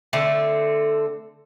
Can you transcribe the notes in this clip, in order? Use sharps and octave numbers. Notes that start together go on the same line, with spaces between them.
D3 A3 C4